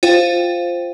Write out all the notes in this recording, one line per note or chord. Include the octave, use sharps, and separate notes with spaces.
F4 C5 F5 G5